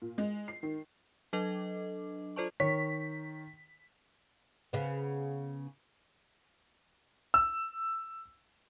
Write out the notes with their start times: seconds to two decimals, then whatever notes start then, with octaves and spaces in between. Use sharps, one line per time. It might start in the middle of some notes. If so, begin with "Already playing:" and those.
0.02 A#2
0.18 G#3
0.48 C7
0.63 D#3
1.33 F#3 D4 A4 D#5 D6
2.36 F4 A4 C5 D5 A5 C#6
2.60 D#3 C#5 B6
4.73 C#3 B3
7.34 E6